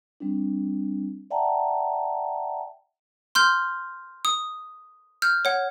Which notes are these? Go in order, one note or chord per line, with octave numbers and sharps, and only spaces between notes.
G3 C4 D4
D5 E5 F#5 G5 A5 A#5
C6 F6 G6
D#6
F6 G6
C#5 F#5